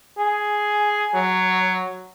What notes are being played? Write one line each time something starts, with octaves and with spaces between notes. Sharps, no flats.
G#4
F#3